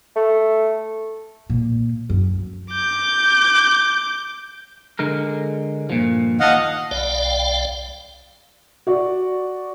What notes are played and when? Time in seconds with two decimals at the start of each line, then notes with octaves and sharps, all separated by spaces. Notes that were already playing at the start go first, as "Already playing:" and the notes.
0.16 A3
1.50 A#2
2.10 F#2
2.72 D6 G6
4.99 D3 G#3 A#4
5.90 G2 A#2 F3
6.40 D#2 D#5 F5 F#5 A5
6.91 B1 D5 F5 G5
8.87 F#4 D5